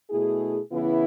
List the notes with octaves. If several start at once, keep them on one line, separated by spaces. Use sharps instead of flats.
B2 A3 E4 G#4
C#3 E3 B3 E4